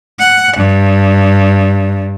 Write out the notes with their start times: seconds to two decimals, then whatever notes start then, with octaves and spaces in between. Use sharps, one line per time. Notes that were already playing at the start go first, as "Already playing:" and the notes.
0.19 F#5
0.56 G2